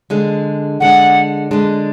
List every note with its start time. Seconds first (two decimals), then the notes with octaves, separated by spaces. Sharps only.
0.10 D3 G#3 D4
0.80 D3 G#3 D4 F#5
1.51 D3 G#3 D4